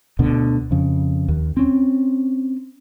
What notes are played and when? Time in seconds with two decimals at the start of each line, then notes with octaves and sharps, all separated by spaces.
0.19 D2 B2 D3
0.71 F2 C#3
1.28 D#2
1.57 C4 C#4